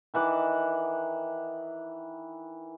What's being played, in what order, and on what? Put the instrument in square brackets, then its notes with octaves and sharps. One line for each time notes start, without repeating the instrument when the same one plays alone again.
[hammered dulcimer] D#3 E3 F#5 D6